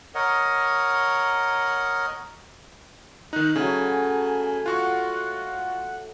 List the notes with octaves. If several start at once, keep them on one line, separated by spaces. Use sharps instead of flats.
A#4 C#5 D#5 F#5
D#3 D#4 F#6
C#3 F#3 A3 G#5
F4 F#4 F#5 C#6